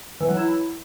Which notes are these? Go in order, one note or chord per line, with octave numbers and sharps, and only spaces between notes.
E3
F#3
E4